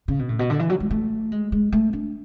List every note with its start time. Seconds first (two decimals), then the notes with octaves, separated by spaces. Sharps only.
0.08 C#3
0.19 B2
0.29 A2
0.39 B2
0.50 D3
0.59 E3
0.70 F#3
0.80 G#3
0.91 A3
1.32 G#3
1.52 G#3
1.72 A3
1.93 D4